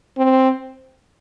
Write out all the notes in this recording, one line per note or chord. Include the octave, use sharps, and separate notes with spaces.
C4